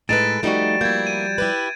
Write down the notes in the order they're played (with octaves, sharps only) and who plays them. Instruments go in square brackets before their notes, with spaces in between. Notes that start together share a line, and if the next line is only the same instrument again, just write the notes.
[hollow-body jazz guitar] A2 D#4 [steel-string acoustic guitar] G#3 A4 B4 [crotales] A6 D7 E7
[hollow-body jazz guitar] F3 G3 F#4 [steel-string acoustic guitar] A3 D#4
[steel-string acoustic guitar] A#3 E4 [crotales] G6 G#6
[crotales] D#7
[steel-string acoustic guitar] E4 G4 B4